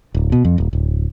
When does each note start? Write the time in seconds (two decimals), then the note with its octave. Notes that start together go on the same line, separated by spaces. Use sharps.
0.14 D1
0.32 B2
0.45 F2
0.58 D#1
0.73 D1